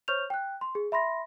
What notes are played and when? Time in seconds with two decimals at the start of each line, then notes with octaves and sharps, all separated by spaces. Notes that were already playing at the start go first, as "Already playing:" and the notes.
0.08 C5 C#5 C#6 F6 G6 F7
0.30 G5 F#6
0.61 C6
0.75 G#4
0.92 E5 B5 C6 A#6